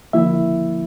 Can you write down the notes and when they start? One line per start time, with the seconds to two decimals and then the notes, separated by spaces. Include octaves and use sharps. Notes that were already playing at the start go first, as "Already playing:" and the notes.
0.13 D3 F3 A#3 E4 E5